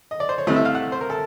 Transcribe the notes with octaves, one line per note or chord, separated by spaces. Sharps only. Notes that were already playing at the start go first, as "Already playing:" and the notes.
D#5
D5
C5
C#5
C2 C3 E3 A3 D#5
E5
F5
F#5
C5
A#4
A4